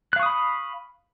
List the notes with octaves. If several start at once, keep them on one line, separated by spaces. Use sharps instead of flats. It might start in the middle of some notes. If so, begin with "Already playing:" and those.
F5 B5 C#6 D#6 F#6